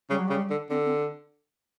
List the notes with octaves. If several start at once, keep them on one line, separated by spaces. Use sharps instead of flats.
C#3 G3
F#3
C#3 G3
D3
D3 C4
C4